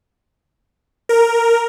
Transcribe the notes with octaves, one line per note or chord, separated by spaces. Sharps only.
A#4